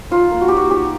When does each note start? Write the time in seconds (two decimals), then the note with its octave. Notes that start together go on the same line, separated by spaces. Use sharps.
0.11 D#4 F4
0.32 A#3
0.41 F#4
0.48 D#4 G4
0.57 F#4
0.71 D#4 G4